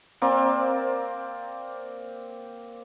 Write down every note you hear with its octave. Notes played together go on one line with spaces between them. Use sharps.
A#3 C4 D5